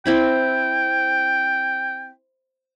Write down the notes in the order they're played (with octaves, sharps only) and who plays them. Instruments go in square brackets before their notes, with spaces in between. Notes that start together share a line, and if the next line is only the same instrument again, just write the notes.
[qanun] C4 E4 B5 [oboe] G5